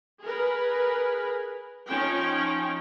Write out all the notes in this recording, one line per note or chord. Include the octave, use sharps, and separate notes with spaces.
G#4 A#4 B4
F3 C#4 D#4 G5